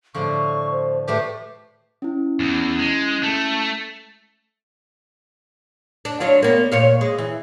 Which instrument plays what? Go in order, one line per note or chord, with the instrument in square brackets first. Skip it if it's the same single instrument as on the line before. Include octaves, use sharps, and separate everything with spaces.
[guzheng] A2 D3 F3 [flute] C#6
[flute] C5
[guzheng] A2 A3 G4 [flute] B4
[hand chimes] C#4 E4
[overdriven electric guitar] E2
G#3
A3
[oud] D4
F#3 D4 F4
A#3 B3
A#2 C#5 F5
G#3
E3